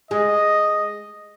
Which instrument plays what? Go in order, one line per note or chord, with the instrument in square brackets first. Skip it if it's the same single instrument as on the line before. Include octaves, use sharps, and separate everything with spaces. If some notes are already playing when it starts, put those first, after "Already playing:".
[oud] G#3 [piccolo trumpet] D#5